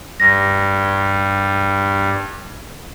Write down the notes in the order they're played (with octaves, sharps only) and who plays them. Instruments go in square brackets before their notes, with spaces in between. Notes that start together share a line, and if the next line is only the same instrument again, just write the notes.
[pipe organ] G2 [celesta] A#6